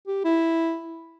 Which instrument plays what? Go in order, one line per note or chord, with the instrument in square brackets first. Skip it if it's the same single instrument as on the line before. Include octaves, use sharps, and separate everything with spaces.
[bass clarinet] G4
E4